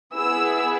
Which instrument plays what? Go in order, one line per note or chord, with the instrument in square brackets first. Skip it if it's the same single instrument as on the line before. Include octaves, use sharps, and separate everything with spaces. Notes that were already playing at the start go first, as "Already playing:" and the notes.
[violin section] B3 E4 G#4 E6